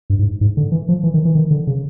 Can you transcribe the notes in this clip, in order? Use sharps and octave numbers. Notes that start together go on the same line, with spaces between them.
G2
G#2
G#2
D3
E3
F3
E3
D#3
E3
D#3
D3
C#3